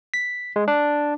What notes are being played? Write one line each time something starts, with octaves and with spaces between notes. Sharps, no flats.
B6
G#3
D4